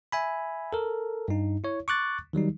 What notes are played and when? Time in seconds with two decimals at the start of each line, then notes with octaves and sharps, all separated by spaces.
0.12 E5 G#5 B5
0.73 A4 A#4
1.28 G2 D#4
1.64 E4 C#5
1.88 C#6 D6 F#6 A6
2.33 D#3 F#3 G3 D#4